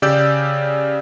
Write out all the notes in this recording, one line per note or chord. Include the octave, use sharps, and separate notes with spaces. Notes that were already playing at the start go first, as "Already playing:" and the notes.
C#3 G4 D5 E6 G6